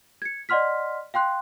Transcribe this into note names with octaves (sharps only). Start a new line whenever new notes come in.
G#6 C#7
D5 D#5 F#5 C6 F6 B6
F5 G5 C6 F#6